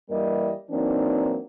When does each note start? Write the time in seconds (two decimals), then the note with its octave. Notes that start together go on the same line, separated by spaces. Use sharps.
0.10 G2 E3 G3 A#3 A#4 D#5
0.71 E3 F#3 A#3 C4 D4 D#4